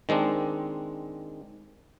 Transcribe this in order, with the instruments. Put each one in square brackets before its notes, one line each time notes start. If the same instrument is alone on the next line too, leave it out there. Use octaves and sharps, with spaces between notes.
[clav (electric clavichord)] D#3 G#3 C4 D4